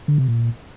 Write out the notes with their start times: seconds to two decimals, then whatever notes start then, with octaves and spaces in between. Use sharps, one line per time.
0.08 D3
0.18 C3
0.28 A#2